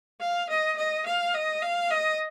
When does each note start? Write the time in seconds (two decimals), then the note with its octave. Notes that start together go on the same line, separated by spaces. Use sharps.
0.20 F5
0.49 D#5
0.77 D#5
1.06 F5
1.34 D#5
1.62 F5
1.91 D#5